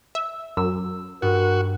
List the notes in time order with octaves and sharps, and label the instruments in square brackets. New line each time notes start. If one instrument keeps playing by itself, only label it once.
[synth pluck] E5
[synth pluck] F#2 [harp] E6
[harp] G2 [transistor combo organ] F#4 [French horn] A#4